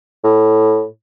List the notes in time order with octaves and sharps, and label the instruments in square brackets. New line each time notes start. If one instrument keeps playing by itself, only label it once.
[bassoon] A2